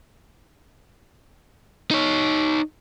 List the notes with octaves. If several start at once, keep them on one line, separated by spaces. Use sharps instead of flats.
D#4 C#5